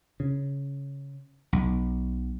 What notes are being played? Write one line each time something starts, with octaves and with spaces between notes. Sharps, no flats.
C#3
B1